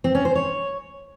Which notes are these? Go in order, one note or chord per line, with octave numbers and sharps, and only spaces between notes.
C4
C#4
C5
C#5